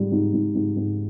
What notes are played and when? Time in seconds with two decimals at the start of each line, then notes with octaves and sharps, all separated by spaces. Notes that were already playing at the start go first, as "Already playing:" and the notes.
Already playing: G#2 G3
0.12 G#2
0.34 G#2
0.55 G#2
0.77 G#2